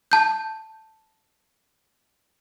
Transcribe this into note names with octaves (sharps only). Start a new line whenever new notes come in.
A5 G6